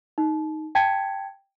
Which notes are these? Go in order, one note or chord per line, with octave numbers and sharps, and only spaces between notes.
D#4
G5 A5 G#6 B6 C#7